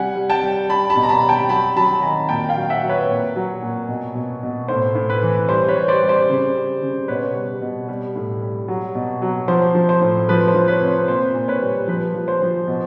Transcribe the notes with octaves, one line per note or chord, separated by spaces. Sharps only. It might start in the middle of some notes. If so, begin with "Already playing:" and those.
Already playing: C3 G3 F#5 G#5
G3
G5 A5
G3
G3 A5 B5
A5 B5
B2
A#5
A5 B5
G3
G5 A5
F#3 A5 B5
F#3 A5 B5
D#3 G#5 A#5
A#2 G5 A5
F5 G5
F#3
E5 F#5
F#3
B4 C#5
A#2
F#3
A#2
B2
B2
B2
A2 C5
A2
B4
E3
G3 C5
B4 C#5
G3
C5 D5
G3
C5 D5
C#3
G3
C#3
B2 B4 C#5
G3
B2
G3
A2
G3
F#3
B2
F#3
F3 C5
F3
C5
A2
F3 B4
C5
F3
B4 C#5
C3
C5
A#2 C5
A#2
B4 C#5
G3
F3 B4
F3
C5
F3
B2